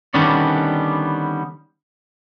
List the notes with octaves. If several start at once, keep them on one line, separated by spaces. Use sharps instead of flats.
D3 D#3 G3 B3 C#4 D5